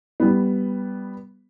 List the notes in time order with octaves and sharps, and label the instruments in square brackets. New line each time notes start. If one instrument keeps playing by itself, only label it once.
[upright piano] G3 B3